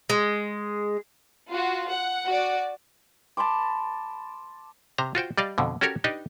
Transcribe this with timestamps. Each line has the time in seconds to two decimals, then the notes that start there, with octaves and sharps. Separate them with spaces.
0.10 G#3
1.51 F4 F#4
1.89 F#5
2.27 F#4 D5
3.37 A5 B5 C6 D6
4.98 C3 C5 A#5
5.15 F4 F#4 C5 G5
5.38 G3 D5 D#5 F5
5.58 F2 B2 D3
5.81 C#4 F#4 G4 A4 A#4 C#5
6.04 D4 D#4 G4 B4 D#5